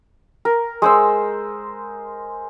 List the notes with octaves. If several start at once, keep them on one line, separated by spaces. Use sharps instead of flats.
A#4
G#3 C5 E6